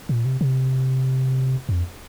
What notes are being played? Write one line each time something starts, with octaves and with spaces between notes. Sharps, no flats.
A#2
C3
C3
F2